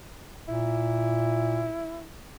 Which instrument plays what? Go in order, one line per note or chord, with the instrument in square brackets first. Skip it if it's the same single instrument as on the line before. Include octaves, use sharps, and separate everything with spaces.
[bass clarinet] A#2 [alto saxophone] E4